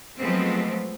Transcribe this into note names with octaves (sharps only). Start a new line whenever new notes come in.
F3 F#3 G#3 A3 B3 C4